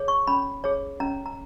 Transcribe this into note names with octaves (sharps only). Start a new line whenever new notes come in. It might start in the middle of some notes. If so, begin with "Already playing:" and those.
Already playing: G#4 C#5
C#6
C#4 B5
G#4 C#5
C#4 A#5
A#5